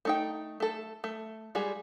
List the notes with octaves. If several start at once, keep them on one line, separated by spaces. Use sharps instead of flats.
A3 D#4 G5
A3 A4
A3
G3 G#3 F#4 G#4